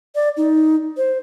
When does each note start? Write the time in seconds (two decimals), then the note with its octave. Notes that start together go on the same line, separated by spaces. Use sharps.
0.15 D5
0.37 D#4
0.97 C5